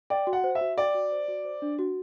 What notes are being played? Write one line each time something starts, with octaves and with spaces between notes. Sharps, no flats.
D5 G5
F#4
F#5
C5
E5
F#4
D5 G5
F#4
C5
F#4
C5
D4
F#4